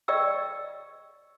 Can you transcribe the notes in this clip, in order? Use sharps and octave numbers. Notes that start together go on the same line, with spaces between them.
D5 D#5 G5 C#6 E6